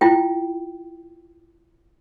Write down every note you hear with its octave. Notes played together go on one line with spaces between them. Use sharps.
E4 F4 G5